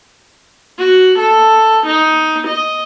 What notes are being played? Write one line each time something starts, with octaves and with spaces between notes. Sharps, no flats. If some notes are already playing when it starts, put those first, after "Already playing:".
F#4
A4
D#4
D#5